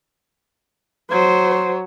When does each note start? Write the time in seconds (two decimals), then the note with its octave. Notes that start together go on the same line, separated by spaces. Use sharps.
1.12 F#3 C5